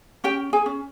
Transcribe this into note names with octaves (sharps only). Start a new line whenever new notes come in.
C#4 G4 G5
G#4 G#5
C#4